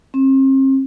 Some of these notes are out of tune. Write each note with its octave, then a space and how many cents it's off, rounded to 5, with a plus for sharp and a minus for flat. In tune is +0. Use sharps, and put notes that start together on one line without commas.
C4 +40